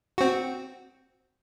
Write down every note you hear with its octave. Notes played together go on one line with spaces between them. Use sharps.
C4 F#4